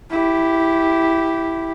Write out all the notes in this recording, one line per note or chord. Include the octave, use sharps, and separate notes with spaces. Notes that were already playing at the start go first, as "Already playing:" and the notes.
E4 G4